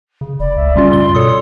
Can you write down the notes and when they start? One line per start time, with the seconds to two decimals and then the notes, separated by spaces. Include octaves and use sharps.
0.21 C#3
0.40 F1 D5 B5
0.56 C#2 E5
0.76 C#3 G3 C#4 F4 C6
0.93 G2 G7
1.15 B2 A4 C#5 D#6